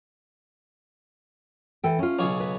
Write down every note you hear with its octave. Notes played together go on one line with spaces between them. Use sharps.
E3 A4 G5
C#4 F4
B1 C#3 C#5
B4